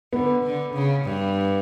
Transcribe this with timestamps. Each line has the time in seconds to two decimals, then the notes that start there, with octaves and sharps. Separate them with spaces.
0.13 D3 B3
0.44 D3
0.74 C#3
1.05 G2